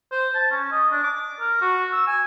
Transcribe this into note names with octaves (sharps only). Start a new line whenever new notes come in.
C5
A5
C#4
D#5
D4
D6
A#4
F#4
E6
G#5